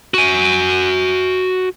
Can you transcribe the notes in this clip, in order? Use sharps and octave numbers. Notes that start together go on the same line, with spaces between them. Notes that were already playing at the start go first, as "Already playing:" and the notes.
F#4 G#5